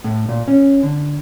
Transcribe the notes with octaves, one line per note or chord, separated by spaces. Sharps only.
A2
A#2
C#4
D3